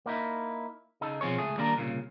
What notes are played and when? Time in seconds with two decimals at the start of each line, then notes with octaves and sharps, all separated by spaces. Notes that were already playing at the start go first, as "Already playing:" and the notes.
0.06 A#3 D#4 E4
1.01 C#3 D#4 A4
1.21 B2 F3 C4 G#4 C#5
1.38 C#2 A3 G#4
1.57 D#3 G3 A#3 D4 A#4 A#5
1.77 C2 A#2 C#3